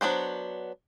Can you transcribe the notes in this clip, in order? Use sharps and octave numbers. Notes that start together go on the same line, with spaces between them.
F#3 B3 D4 C5